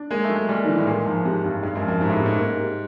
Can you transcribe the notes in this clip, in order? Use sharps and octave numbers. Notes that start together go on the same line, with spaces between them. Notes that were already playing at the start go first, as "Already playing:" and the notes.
Already playing: D4
G#3 A#3
A3
F#3
G#3
A#2 G3
D#3
E3 D4
A2
A#2 G#3
G#2 F3
G#2 C3
G2 C3
G2 G#3
F#2
F3
F#2
G#2 C3
A2
G#2
C3
G#2
A#3
G3